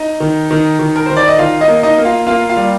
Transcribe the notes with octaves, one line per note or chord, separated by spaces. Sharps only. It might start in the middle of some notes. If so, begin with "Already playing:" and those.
Already playing: D#4
D#3
D#3
D#3
A#4
D#3 C5
D5
D#5
D#3 F4 F5
D#4 D#5
A#3
D#4 D#5
A#3
F4 F5
A#3 F4 F5
F4 F5
G3